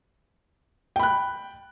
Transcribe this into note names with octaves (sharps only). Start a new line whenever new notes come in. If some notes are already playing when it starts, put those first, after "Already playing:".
G5 B5 F#6